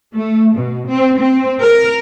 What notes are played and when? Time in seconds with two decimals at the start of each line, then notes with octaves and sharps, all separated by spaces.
0.16 A3
0.56 B2
0.87 C4
1.19 C4
1.62 A#4